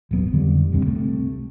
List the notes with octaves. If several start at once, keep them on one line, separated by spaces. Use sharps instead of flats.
D#1 G#1 F#3 B3
F2 D3 D#3 G3
E1 C2 G2 C3
C2 C3 A3